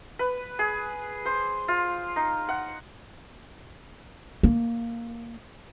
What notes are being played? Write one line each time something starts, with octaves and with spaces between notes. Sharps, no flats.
B4
G#4
C5
F4
D#4
F#5
A#3